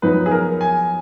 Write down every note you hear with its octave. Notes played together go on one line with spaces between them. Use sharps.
F#2 F3 B3 D#4 B4
G#4
A#4
G#5